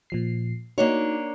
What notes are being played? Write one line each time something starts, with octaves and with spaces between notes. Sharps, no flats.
A#2 F3 C7
A#3 D4 D#4 F#4 C#5